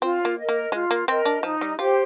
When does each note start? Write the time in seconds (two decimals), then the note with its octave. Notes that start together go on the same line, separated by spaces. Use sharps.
0.02 C4 F4
0.25 A#3
0.38 A#4 D#5
0.49 A#3
0.72 G#3 F4
0.91 A#3
1.08 C4 A#4 D#5
1.25 D4
1.43 F3 D#4
1.61 G3
1.79 F4 G4 C5